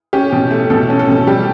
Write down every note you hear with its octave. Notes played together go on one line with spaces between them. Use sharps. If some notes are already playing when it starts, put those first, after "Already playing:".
C#4 G4
B2
A3
B2 A4
C#4
A4
B2
G3 G4